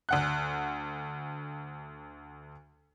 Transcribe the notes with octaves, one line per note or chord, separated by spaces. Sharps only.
D2 F#5 F#6